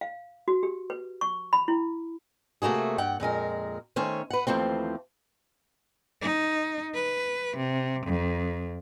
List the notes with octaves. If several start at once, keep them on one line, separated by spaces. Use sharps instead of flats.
F5
F#4
G4
B4
C#6
B5
E4
C3 A3 A#3 F#4 G#4
G2 F#5 G5
F2 A#2 G#3 A#4
D#3 A3 C#4 C5 C#5
B4 F#5
D#2 E3 F3 A3 C4
D#4
B4
C3
F2